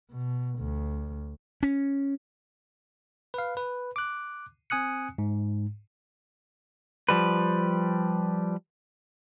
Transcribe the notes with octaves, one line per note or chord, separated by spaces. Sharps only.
B2
D2
C#4
B4 F5
B4
D6 F#6
C4 G#5 D#6 F#6 C#7
G#2
F3 G3 B4